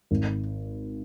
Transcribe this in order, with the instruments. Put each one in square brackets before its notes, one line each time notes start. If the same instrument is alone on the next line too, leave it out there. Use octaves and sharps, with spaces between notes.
[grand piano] G#1